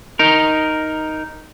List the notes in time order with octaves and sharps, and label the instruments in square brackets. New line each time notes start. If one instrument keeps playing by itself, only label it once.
[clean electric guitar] D#4 A#4